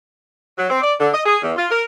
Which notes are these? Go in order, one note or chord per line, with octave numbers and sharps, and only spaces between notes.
F#3
C4
D5
D3
D#5
G#4
E2
F4
A#4